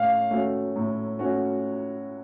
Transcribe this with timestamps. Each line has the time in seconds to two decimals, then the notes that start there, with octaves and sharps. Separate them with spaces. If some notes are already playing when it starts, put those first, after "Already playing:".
Already playing: A2 C#4 F5
0.30 A3 C#4 F#4
0.76 A2
1.19 A3 C#4 F#4